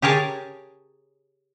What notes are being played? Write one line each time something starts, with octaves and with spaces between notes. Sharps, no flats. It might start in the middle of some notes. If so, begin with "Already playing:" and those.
G4 G#4 A#4 C#5 A5